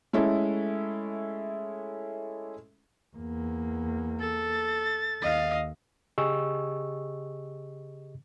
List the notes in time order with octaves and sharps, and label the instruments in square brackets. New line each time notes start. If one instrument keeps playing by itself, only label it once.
[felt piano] G#3 A3 C#4 E4 A4
[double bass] E2 A#3
[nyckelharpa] A4 [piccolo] A6
[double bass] D#2 [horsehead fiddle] D#5 F5
[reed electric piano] C#3 G4 G#4 D#5 C#6 E6